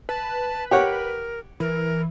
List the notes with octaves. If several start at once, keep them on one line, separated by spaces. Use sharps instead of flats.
B4 A5
G4 A#4 C#5 F#5
E3 A#4